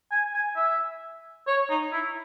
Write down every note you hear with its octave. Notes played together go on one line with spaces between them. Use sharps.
G#5
G#5
E5
C#5
D#4
E4